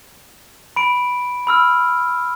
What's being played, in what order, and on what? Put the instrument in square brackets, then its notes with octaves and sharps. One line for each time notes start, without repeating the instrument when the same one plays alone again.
[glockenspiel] B5 D7
B5 E6 F6